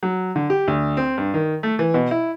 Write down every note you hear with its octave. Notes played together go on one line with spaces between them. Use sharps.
F#3
D3
G4
D2
C4
G2
D#3
A3
E3
B2
E4